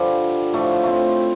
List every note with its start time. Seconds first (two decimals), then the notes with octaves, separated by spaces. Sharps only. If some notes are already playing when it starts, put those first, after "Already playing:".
Already playing: G2 D3 F3 G3
0.53 A2 F3 A3
0.83 A3 C4